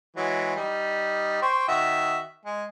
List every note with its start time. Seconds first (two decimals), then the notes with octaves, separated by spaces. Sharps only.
0.17 E3 F#3 G#3
0.56 G3 D#4
1.42 C5 G5 C#6
1.68 D#3 F#4 E5
2.46 G#3